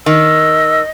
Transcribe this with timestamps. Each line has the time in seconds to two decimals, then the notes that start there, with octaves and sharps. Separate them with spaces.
0.06 D#3 D#5 E6